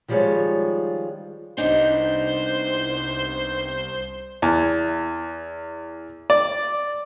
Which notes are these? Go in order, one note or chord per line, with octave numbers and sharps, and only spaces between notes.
D#3 F3 G3 G#3 F4 C#5
C2 B3 D4 D#4 C5 G6
E2
D5